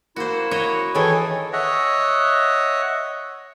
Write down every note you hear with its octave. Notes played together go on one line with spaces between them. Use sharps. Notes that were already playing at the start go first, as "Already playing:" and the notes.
A#3 E4 F#4 C5
F#4 C#5 D#5
D#3 E3 G#4 A4 C#5
C#5 D#5 E5 F#5